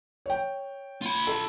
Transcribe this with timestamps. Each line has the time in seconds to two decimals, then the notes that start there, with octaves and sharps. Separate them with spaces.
0.26 C#5 G5
1.02 F4 B5
1.27 A4